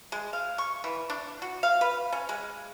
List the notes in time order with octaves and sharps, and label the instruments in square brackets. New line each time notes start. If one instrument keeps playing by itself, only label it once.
[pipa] G#3
F5
C#6
E3
D4
F#4
F5
B4
C#4
G#3